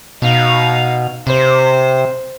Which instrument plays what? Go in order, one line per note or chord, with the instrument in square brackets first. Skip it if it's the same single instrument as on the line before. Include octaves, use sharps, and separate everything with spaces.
[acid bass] B2 [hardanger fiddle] D#4 F5
[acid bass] C3 [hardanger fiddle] C5